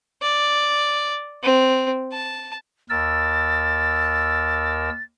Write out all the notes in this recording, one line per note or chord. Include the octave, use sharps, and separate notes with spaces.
D5
C4
A5
D#2 A#4 E6 A6